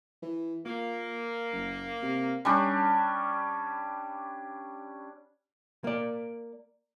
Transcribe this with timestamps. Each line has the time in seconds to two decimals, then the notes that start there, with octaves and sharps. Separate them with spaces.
0.22 E3
0.65 A#2 A#3
1.52 F#1
2.02 C3
2.45 G3 C#4 D4
5.84 A#3 D5